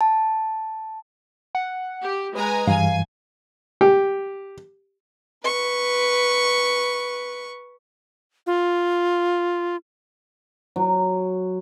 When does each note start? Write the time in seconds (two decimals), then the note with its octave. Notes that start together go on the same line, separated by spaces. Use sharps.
0.01 A5
1.55 F#5
2.02 G4
2.35 G#3 B4 G#5 A#5
2.67 G2 E3 F5 G#5
3.81 G4
5.43 B4 C#6
8.47 F4
10.76 F#3